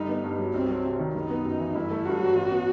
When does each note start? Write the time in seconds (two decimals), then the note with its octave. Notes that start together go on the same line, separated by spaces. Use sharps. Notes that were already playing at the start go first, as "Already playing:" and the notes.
Already playing: G1 G3 D#4
0.08 B3
0.24 G2
0.38 F#3
0.54 C2 C4
0.68 F#3
0.85 C3
0.99 D#3
1.15 F#1 D#4
1.30 B3
1.45 F#2
1.60 E3
1.75 G1 E4
1.91 A3
2.05 G2 F#4
2.20 F#3
2.35 A1
2.51 B3